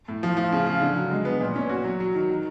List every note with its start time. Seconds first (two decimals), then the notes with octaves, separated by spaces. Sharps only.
0.08 A2
0.23 F3
0.37 F3
0.52 C#3
0.66 C#3
0.81 D3
0.97 F#3
1.11 G#3
1.25 B3
1.40 A#2
1.56 C#4
1.69 F#4
1.85 F#3
2.00 F#3
2.14 D#3
2.29 D#3